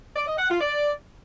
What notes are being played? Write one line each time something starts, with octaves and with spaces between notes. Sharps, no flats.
D5
D#5
F#5
F4
D5